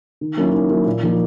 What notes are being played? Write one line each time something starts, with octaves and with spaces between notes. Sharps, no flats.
D#3
F#3 A#3 C#4 E4
D#3
F#3 A#3 C#4 E4
A#2
F3 A#3 D#4